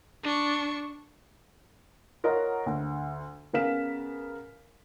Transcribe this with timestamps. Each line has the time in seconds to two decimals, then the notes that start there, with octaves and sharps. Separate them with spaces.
0.23 D4 C#6
2.24 F4 A#4 C#5 D#5 F#5 A#5
2.66 D2
3.53 C#3 B3 A#4 F5 B6 E7